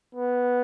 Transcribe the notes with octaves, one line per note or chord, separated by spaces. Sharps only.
B3